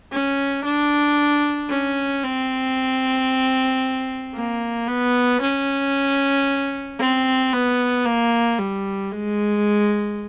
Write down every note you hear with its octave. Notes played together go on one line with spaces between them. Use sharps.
C#4
D4
C#4
C4
A#3
B3
C#4
C4
B3
A#3
G3
G#3